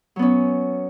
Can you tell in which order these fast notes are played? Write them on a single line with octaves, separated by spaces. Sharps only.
F#3 B3 C#4